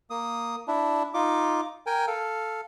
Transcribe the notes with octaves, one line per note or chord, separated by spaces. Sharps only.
A#3 D#6
D4 E4
D#4 F4 D6
A#4 G5 G#5
A4 F5